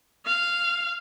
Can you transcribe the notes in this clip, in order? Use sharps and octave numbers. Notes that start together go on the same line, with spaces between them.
F5